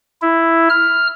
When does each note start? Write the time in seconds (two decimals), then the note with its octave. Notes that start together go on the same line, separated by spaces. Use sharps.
0.22 E4
0.70 F6